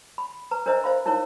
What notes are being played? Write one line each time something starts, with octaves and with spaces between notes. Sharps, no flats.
B5
B4 A#5
D4 A#4 C5 D#5 E5 A#5
C5 F5 B5
D#4 E4 A#4 C#5